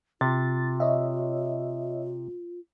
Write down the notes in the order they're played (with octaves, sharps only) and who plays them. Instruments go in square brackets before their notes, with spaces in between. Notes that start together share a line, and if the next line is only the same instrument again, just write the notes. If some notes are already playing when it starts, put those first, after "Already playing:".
[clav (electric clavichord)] C3 [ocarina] F4 [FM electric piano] A6
[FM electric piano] C#5 D#5 E5